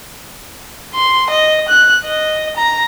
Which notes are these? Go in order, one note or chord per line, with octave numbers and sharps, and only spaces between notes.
C6
D#5
F#6
D#5
A#5